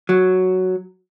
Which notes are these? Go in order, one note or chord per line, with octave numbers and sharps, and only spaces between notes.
F#3